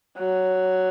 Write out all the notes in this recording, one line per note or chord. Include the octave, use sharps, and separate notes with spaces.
F#3